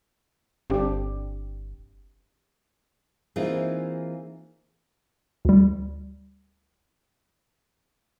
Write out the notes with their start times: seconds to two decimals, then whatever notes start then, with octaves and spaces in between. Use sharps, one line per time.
0.70 G1 C4 D4 G4
3.36 E3 A#3 C4 D#4 F4 G#4
5.45 D2 G3